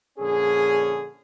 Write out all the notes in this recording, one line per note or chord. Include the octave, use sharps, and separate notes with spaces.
A#1 D3 C#4 G#4